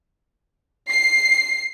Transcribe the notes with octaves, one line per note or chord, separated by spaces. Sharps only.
C7